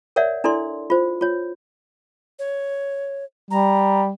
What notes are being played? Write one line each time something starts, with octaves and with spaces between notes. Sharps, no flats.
A#4 C#5 D5 E5 F#5
D4 E4 A4 D5 C6
F4 C5
F4 C#5
C#5
G3 A#5